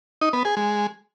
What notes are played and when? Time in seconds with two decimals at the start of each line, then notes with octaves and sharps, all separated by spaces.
0.21 D#4
0.33 B3
0.45 G#4
0.57 G#3